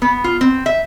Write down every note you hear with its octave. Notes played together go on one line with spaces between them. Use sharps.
B3
F4
C4
E5